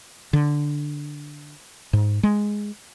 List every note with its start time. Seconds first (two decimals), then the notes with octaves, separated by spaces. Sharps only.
0.33 D3
1.93 G#2
2.23 G#3